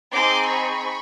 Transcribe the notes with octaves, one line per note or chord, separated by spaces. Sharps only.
C4 D#4 G#4 C6 D6
B5 C#6